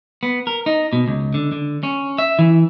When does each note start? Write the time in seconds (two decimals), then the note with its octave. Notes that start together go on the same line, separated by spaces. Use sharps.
0.23 B3
0.47 A#4
0.66 D#4
0.93 B2
1.07 C#2
1.34 D3
1.52 D3
1.83 C#4
2.18 E5
2.39 E3